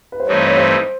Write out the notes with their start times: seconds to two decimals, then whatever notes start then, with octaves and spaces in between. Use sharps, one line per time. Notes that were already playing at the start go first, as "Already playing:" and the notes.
0.12 B4
0.20 C5
0.26 G2 E3 A3 C4 D#4 C#5
0.38 C5
0.48 C#5
0.57 C5